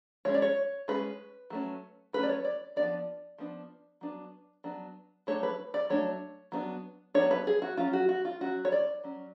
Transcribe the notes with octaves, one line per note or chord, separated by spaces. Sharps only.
G#3 C#4 C#5
D5
C#5
G#3 C#4 B4
F#3 A3 C#4
F#3 A3 C#4 B4
D5
C#5
D5
F3 B3 D4 D5
F3 B3 D4
F#3 B3 D4
F#3 B3 D4
F#3 A3 D4 C#5
B4
D5
F#3 A3 D4 C#5
F#3 B3 D4
F#3 B3 D4 C#5
B4
G#4
F#4
F#3 C#4 F4
F#4
F#4
F4
F#3 C#4 F#4
C#5
D5
F#3 C#4